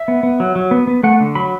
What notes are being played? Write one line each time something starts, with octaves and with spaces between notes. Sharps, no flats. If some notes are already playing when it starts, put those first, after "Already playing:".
Already playing: E5
B3
B3
F#3
F#3
B3
B3
A3 F#5
D3
F#3 B5